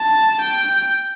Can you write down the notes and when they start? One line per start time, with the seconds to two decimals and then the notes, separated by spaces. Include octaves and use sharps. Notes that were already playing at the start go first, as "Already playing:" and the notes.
Already playing: A5
0.41 G5